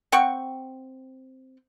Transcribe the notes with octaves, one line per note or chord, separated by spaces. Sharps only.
C4 F#5 G5 C#6